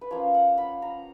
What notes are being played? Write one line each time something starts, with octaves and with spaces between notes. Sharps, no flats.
B4
F3 A#3 C#4 F4 C#5
F#5
B5
A#5